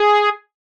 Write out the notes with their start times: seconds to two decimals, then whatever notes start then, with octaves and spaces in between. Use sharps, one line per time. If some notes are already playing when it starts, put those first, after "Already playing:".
Already playing: G#4